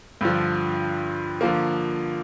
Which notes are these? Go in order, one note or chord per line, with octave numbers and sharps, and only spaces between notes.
G2 D3 F3
D3 F3 A#3